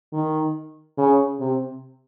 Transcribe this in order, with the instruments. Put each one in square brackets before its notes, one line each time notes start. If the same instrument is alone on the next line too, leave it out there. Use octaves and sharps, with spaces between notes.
[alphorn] D#3
C#3
C3